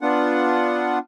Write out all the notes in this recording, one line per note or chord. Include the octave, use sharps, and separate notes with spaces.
B3 D4 F4 F#5